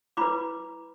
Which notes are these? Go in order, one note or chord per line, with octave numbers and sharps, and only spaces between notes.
E4 B4 B5 D6